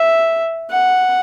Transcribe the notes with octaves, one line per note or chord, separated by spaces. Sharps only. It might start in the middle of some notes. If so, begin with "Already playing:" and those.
Already playing: E5
F#5